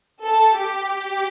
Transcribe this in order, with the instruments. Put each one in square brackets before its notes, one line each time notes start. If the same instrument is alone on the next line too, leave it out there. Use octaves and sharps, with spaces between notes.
[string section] A4
G4